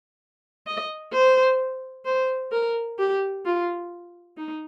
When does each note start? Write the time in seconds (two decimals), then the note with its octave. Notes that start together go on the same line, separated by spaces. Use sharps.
0.67 D#5
1.13 C5
2.05 C5
2.52 A#4
2.98 G4
3.45 F4
4.37 D#4